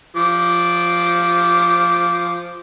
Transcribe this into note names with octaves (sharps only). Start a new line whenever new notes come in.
F3 D6